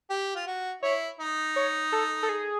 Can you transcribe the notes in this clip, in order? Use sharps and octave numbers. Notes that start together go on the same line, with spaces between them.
G4
F4
F#4
E4 C#5
D#4
C#5
A4
A4
G#4